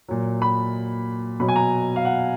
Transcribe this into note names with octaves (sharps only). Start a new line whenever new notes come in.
A#2 F#3
B5
B2 F#3 B5
G#5
A#5
F5
F#5